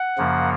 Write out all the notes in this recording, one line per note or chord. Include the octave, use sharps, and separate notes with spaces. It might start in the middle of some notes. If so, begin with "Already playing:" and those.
Already playing: F#5
F#2 C#3 F3 A#3